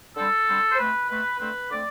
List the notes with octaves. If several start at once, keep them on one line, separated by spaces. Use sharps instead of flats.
D3 G3 C4 A4
D3 G3 C4
C5
B2 A3 C4 B4
B2 A3 C4 B4
D3 A3 C4 B4
D3 A3 C4 D5